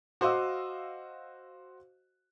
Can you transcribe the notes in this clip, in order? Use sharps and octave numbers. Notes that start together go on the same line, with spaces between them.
F#4 C5 D#5 F5 D6 E6